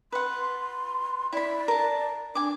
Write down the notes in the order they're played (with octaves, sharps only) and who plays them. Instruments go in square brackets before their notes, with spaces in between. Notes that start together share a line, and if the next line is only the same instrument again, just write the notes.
[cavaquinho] B4 F#5 [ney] C6
[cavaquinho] E4 B5 [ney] D5
[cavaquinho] A#4 A5
[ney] D4 [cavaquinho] G#5 D6